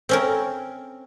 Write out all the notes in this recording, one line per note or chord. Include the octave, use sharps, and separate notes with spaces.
C4 C#4 A#4